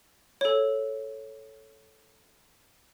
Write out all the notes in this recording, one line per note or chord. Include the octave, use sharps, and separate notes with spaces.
A4 C#5